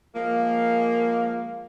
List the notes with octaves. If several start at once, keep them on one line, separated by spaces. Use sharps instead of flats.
F3 G#3 A#3